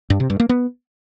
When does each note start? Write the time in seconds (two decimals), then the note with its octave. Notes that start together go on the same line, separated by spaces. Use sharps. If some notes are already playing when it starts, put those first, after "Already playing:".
0.10 G2
0.20 C3
0.30 G2
0.40 A#3
0.49 B3